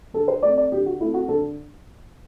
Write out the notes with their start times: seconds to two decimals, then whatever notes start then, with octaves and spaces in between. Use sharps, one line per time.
0.13 D3 A4
0.28 C5
0.42 A3 D5
0.46 C4
0.58 D5
0.72 D3 G4
0.86 F#4
1.01 A3 C4 E4
1.14 F#4
1.29 D3 A4